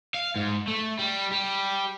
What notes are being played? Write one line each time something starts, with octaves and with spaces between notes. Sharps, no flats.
F5
G#2
A3
G3
G3